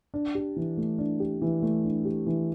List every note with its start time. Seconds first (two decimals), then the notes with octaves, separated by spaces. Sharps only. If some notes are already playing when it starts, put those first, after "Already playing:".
0.14 D4
0.35 G4
0.56 E3
0.77 A3
0.99 D4
1.20 G4
1.42 E3
1.62 A3
1.84 D4
2.05 G4
2.27 E3